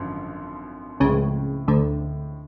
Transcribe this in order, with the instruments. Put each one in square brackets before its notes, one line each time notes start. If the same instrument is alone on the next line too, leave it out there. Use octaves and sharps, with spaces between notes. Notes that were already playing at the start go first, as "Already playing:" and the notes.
Already playing: [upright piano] G#1 F#2 D3 F3
[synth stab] C#2 C#3 [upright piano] A2 F3 G#3 C4
[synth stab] D2 D3